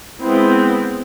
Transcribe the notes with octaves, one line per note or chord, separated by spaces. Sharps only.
G#3 B3 C4 E4